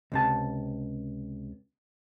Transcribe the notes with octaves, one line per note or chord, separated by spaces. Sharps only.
C#2 C3 A5